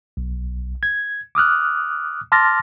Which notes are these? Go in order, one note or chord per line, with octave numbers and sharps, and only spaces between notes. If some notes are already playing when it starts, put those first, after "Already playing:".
B1
G#6
D6 D#6 F6 F#6
A5 C6 D6 F6 A6 A#6